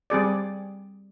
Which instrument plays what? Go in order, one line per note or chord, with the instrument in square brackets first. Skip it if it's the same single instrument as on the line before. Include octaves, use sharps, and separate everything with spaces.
[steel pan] G3 C4 G#4 D5